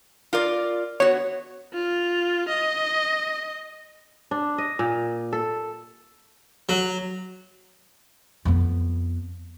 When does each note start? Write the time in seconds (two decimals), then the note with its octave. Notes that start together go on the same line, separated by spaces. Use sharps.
0.33 F4 A#4 D5
1.00 B3 F#4 C#5
1.74 F4
2.49 D#5
4.31 D4
4.58 D#5
4.79 A#2
5.33 A4
6.69 F#3
8.45 F2 B3